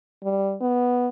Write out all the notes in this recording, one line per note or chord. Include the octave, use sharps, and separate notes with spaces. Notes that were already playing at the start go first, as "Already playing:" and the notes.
G3
B3